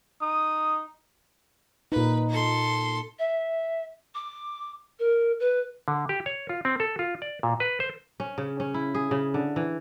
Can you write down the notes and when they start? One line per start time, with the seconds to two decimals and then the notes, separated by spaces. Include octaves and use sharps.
0.21 D#4 D#6
1.92 A#2 D#4 B4
2.29 A4 C6
3.18 E5
4.14 D6
4.99 A#4
5.39 B4
5.88 D3
6.09 G4
6.26 C#5
6.49 F4
6.65 C4
6.80 A4
6.99 F4
7.22 D5
7.43 A#2
7.60 B4
7.80 C5
8.20 C#4
8.38 C#3
8.60 C#4
8.74 E4
8.95 G#4
9.11 C#3
9.34 D3
9.56 E3